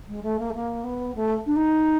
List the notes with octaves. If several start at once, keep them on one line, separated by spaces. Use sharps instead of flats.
G#3
A3
A#3
A3
A#3
B3
A3
D4
D#4